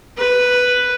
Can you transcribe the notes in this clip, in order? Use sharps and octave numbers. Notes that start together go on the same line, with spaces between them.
B4